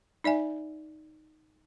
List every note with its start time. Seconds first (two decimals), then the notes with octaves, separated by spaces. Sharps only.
0.24 D#4 D5 E5 G#5